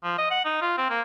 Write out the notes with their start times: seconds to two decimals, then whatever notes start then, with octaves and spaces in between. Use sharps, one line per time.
0.03 F3
0.18 D#5
0.31 F#5
0.45 D#4
0.61 F4
0.77 C4
0.90 A#3